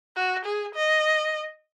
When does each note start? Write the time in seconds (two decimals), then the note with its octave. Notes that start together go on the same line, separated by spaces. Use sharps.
0.16 F#4
0.45 G#4
0.75 D#5